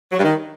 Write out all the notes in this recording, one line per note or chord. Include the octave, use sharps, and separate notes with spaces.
F#3
G2
D#3